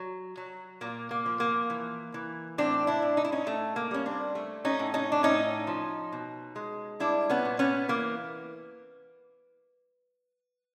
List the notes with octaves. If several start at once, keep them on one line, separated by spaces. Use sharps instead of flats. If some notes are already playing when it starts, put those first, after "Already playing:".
Already playing: F#3
F#3
A#2 A#3
A#3
F3
A#3
E3
E3
A2 C4 D4
D4 E4
A2
D#4
E4
C#4 D#4
A2 A3
A#3
G3 C#4
C4 D4
A3
C#4 D#4
A2
C#4 D#4
D4
A2 C#4 D#4
F3
B2
G#3
G3 D4 E4
B3 C#4
A#2
B3 C#4
E3 A#3